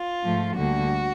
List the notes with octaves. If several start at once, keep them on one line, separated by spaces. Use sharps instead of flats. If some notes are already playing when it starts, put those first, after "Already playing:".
Already playing: F4
G#2 F3 A3
D2 D3 G3 A#3 F#4